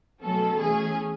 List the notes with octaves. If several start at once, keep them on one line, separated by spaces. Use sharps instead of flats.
B2 F#3 A3 C#4 A4
E3 A3 C#4 G#4